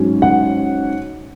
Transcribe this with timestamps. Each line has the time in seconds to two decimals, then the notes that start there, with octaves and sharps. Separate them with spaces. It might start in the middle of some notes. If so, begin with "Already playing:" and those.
Already playing: G#2 F#3 C#4
0.22 F#5